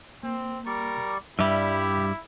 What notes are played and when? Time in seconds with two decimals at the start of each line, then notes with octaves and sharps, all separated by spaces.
0.23 A#3 C4
0.66 G3 A#4 D5 C#6
1.39 G2 G3 E4 G4 E5 E6